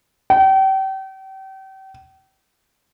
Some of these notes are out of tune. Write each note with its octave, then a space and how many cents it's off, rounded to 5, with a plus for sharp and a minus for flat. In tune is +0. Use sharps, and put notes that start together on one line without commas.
G5 -35